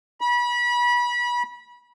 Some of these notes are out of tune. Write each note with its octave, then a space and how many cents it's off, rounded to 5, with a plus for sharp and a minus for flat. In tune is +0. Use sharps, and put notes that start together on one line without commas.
B5 -30